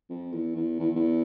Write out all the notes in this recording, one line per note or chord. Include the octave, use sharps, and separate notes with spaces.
F2
E2
E2
E2
E2